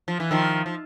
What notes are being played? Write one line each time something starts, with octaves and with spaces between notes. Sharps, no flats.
F3
E3
D#3 F3
F3